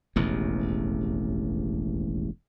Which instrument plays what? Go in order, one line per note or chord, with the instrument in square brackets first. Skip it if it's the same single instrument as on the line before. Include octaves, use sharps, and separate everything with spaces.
[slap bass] E1 A1 D#2